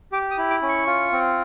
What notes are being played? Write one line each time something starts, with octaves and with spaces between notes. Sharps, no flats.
G4 D6
D#6
E4
D6
C#4
C#6
F4
C4